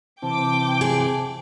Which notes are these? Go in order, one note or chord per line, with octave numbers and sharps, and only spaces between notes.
C3 E3 C4 G5 A5 D6
G#4